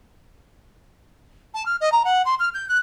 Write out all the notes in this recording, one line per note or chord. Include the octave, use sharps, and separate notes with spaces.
A5
F6
D#5
A#5
F#5
C6
F6
G6
F#6